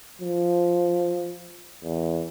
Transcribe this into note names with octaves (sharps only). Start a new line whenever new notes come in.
F3
E2